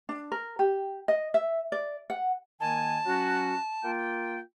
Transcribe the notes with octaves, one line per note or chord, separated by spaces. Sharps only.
D4
A#4
G4
D#5
E5
D5
F#5
D#3 A#3 G#5 A5
F#3 C#4 F#4
A#3 F4 G5